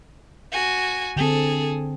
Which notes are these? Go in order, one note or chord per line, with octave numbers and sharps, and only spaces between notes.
F#4 G#5
D3 C4 G#4 A4